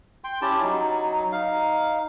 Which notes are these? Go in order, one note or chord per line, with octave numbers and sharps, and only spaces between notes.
G5 C6
C#4 E4 G4 A5
F#3 D#4
D#4 F5